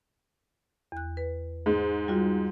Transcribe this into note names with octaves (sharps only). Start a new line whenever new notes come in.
E2 F#6
B4
G#2
G3 F4 F#4